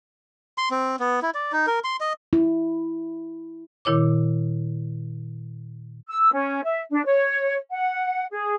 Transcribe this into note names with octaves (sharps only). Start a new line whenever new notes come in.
C6
C4
B3
E4
D5
D#4
A#4
C6
D#5
E4
A#2 D#3 E4 C#5 D6
E6
C#4
E5
D4
C#5
F#5
G#4